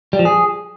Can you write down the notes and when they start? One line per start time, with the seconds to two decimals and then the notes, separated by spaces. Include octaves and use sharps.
0.13 G3
0.19 F3
0.25 G#4